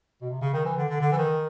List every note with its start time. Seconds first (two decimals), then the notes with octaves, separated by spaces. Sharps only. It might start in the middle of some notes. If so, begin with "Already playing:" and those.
0.22 B2
0.30 C3
0.42 C#3
0.54 D#3
0.65 E3
0.77 D3
0.89 D3
1.01 D3
1.12 E3
1.18 D#3